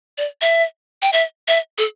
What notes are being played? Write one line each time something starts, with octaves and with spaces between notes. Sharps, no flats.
D5
E5
G5
E5
E5
A4